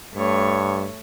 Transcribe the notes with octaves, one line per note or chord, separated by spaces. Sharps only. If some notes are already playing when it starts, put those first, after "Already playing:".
G2 A3 C#5